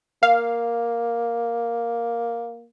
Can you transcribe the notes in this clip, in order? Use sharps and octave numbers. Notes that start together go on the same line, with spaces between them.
A#3 F5